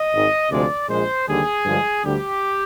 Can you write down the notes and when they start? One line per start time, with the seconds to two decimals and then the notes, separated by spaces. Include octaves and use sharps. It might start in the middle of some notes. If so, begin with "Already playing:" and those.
Already playing: D#5
0.13 G#1 G#2 D#3
0.51 D2 C3 F3 G#3 D5
0.89 A#1 A#2 G#3 C5
1.28 D#2 D3 G3 G#4
1.65 G2 D3 F3 G#3
2.04 D2 D3 G3 G4